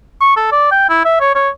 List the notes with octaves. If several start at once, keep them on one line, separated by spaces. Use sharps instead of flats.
C#6
A4
D5
G5
E4
E5
C#5
C#5